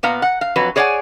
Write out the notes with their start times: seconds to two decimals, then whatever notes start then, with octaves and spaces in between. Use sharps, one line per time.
0.03 A#2 B3 F5 A#5
0.22 F#5
0.41 F5
0.56 F2 F#3 B4
0.76 G#4 C#5 D5 F5 F#5 G#5